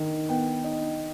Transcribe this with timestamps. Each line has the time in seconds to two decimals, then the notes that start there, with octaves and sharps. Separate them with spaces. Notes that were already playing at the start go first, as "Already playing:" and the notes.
Already playing: D#3 D#4
0.29 B3 G5
0.64 D#4